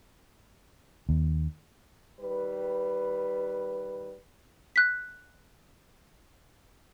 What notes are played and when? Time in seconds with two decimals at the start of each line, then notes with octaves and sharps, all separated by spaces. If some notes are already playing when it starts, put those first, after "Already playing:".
1.09 D#2
2.20 D#3 G3 B4
4.76 F#6 B6